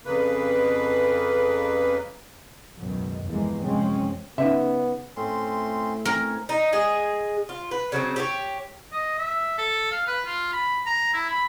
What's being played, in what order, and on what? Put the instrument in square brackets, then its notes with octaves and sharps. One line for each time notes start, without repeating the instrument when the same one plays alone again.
[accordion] F2 C#3 A#3 B4
[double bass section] C#2 F#2 B2 D#3
G1 E2 E3 F3 G#3 A#3
F#1 C3 F3 G#3 C4 C#4
[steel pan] C#3 [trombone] B3 [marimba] C#4 D#4 [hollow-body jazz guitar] E5
[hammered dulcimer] A2 [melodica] C4 C#4 C6
[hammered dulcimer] C4 [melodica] C#4 C#5 [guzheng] A#4
[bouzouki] D#4
G#3 G#4
F4
B4
C#3 F#3 A#3 C4
G4 A4 C#5
[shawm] D#5
E5
A4
F5
B4
F4
B5
A#5
E4
B5